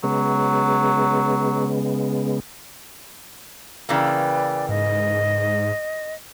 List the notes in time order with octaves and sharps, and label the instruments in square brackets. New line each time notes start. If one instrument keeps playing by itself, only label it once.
[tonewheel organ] C#3 G#3 B3 [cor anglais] F#3
[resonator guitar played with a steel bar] C#3 E3 A#3 [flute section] B4 D5 G5
[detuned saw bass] G#2 [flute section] D#5